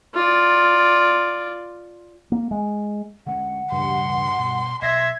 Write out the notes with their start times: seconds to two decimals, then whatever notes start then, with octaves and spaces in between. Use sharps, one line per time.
0.15 F4 D5
2.32 A#3
2.51 G#3
3.26 D3 G#3 C#4 F#5
3.72 E1 D2 G2 C#3 C6
4.38 B2
4.82 B1 E5 C6 G#6 A#6